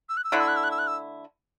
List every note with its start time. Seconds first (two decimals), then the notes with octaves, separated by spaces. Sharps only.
0.09 E6
0.17 F#6
0.24 E6
0.32 D3 A3 E4 F#6
0.40 E6
0.48 F#6
0.56 E6
0.64 F#6
0.71 E6
0.79 F#6
0.87 E6